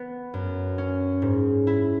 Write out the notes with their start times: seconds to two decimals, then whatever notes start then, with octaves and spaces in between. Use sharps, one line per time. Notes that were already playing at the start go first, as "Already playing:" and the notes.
Already playing: B3
0.34 F#2
0.78 C#4
1.22 G#2
1.67 E4